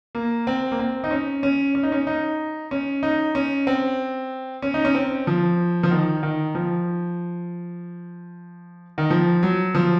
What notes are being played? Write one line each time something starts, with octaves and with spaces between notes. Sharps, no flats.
A#3
C4
A#3
C4
D#4
C#4
C#4
C#4
D#4
C#4
D#4
C#4
D#4
C#4
C4
C#4
D#4
C#4
C4
F3
F3
D#3
D#3
F3
D#3
F3
F#3
F3